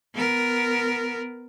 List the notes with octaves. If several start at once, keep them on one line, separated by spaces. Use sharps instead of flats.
B3 A#4